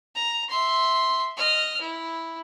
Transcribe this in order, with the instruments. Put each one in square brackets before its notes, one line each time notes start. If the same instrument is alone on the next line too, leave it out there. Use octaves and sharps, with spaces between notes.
[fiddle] A#5
E5 C6
D#5 F6
E4